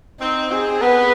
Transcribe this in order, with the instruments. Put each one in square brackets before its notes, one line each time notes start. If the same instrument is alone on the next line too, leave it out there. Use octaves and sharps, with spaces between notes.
[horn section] C4 [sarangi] D#4
[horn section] C4 [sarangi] G#4
[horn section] B3 [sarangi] B4